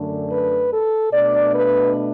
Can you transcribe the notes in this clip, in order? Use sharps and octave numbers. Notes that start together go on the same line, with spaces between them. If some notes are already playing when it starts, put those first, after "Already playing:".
Already playing: F#2 D3 A3 D4
B4
A4
B2 A3 D4 D5
B4